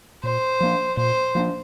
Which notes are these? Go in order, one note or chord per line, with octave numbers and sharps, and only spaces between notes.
A#2 C5
F3 A#3 D4
A#2 C5
F3 A#3 D4